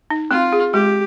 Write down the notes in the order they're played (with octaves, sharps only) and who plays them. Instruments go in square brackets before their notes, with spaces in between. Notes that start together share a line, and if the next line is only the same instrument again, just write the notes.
[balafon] D#4
[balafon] C4 [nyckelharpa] F4
[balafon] G#4
[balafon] G#3 [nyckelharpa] G4